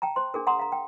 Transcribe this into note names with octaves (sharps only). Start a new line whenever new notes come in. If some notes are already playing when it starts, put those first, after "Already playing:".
G5 A5 A#5
C5 C6
D4 G#4 A#4
F#5 A#5 C6 D#6
F5 A#5
G5